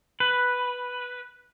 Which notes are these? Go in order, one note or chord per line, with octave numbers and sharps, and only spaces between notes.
B4